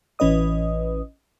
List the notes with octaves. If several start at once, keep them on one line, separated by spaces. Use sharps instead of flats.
A1 E3 C#4 B4 D#5 D#6